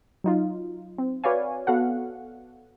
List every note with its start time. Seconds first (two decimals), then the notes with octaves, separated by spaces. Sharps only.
0.24 F#3 D#4 F4
0.98 C4
1.24 F#4 B4 C#5 D5 F5 G#5
1.67 B3 F#4 A4 F5 F#5